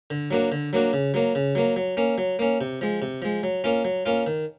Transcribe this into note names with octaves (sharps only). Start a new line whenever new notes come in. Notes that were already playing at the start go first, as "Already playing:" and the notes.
D3
F#3 A#3 D4 F#4
D3
F#3 A#3 D4 F#4
C#3
F#3 A#3
C#3
F#3 A#3
F#3
A#3 C#4
F#3
A#3 C#4
C3
F3 G#3
C3
F3 G#3
F#3
A#3 C#4 F4
F#3
A#3 C#4 F4
D#3